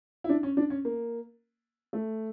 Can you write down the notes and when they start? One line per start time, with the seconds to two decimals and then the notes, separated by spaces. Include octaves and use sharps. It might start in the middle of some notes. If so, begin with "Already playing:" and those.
0.24 E4
0.29 D4
0.43 C#4
0.57 D4
0.70 C#4
0.85 A#3
1.93 A3